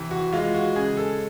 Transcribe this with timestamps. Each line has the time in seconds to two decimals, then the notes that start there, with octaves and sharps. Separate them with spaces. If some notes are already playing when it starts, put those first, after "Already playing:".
Already playing: C3 E3
0.11 F#4
0.33 G#3 F4
0.54 F#4
0.76 C#3 G#4
0.97 A4